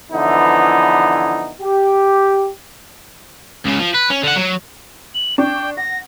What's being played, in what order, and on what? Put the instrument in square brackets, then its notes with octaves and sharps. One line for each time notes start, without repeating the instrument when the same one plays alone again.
[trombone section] D3 E3 F3 B3 D#4 E4
G4
[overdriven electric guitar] C#2 C#3
F3
B4
C#4
D3 F#5
F#3
[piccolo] F#7
[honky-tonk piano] D4 C#6 [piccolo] G5
[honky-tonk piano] F#5 [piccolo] A#6